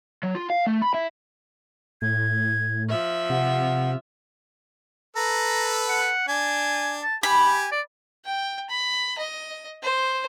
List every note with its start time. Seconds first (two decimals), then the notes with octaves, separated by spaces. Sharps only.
0.23 F#3
0.35 F4
0.50 F5
0.67 A3
0.82 B5
0.94 E4
2.02 A2 G#6
2.89 F3 E5
3.30 C3 F#5
5.16 A4 B4 A#5
5.89 F#5
6.28 D4 G#5
7.03 A5
7.23 G4 G#5 B5
7.72 D5
8.25 G5
8.69 B5
9.18 D#5
9.83 C5